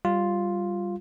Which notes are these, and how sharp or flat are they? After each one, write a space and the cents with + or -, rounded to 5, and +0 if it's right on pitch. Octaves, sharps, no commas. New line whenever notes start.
G3 +0 F4 +0